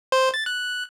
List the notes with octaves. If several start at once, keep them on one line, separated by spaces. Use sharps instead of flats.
C5
A6
F#6